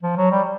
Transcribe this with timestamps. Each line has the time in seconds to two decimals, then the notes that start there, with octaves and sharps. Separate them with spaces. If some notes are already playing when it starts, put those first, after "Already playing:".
0.03 F3
0.17 F#3
0.31 G3